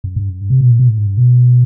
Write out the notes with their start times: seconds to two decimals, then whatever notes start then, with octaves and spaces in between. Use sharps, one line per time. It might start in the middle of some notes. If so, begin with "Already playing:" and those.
0.04 F#2
0.16 G2
0.29 F#2
0.41 G2
0.50 C3
0.61 B2
0.70 A#2
0.80 B2
0.88 A2
0.98 G#2
1.07 G2
1.17 B2